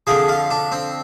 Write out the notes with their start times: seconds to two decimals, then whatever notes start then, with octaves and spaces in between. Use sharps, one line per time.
0.07 F2 D3 F3 G#4
0.29 F4
0.51 D4
0.72 C4